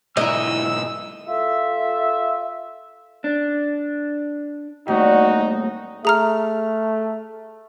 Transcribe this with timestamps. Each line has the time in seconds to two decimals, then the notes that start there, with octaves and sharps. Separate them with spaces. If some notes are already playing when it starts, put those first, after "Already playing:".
0.17 G#2 B2 E3 E4 A#4 D#5 E6
1.26 F4 A4 E5
3.24 D4
4.88 D#2 A2 G3 D#4 F#4
6.05 A3 G#4 A#5 F6